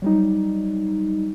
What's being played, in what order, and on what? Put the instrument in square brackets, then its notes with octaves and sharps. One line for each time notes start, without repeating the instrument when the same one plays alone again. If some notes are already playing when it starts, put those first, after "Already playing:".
[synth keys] F#3 G3 D#4